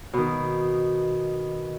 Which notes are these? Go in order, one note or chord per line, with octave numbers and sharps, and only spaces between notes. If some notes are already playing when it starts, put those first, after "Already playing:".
B2 D#3